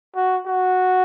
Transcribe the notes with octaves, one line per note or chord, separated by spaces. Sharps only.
F#4
F#4